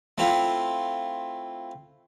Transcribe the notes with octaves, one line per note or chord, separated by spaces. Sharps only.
A3 C4 E4 F4